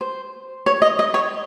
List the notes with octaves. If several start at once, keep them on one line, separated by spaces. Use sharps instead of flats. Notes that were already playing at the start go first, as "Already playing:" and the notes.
C5
C#5
D#5
D#5
C#5